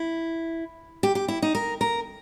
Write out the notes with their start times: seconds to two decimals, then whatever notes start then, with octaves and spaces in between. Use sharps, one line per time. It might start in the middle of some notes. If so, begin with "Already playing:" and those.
Already playing: E4
1.03 G4
1.15 G4
1.28 E4
1.42 D#4
1.55 A#4
1.81 A#4